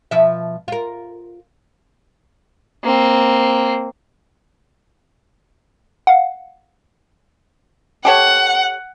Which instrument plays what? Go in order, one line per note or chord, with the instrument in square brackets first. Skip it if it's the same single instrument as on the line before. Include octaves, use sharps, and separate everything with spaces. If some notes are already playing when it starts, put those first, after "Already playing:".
[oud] B2 F3 E5
F4 A#4
[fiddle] A#3 C4
[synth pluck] F5 F#5
[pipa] G4 A4 C#5 [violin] F#5